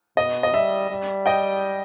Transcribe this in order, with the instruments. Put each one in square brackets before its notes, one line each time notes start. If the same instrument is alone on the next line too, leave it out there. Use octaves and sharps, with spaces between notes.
[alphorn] B2 [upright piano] D#5
[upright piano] D#5
[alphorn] G3 [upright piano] E5
[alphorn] G3
[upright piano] D#5 G5